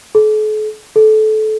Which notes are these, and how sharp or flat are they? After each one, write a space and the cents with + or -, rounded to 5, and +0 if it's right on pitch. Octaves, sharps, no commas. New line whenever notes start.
A4 -45
A4 -25